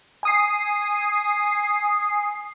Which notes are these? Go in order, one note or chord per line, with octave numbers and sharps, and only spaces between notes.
G#5 D#6 C7